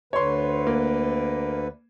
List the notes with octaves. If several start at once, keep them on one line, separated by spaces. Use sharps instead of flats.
D2 D3 B4 C#5 C6
A#3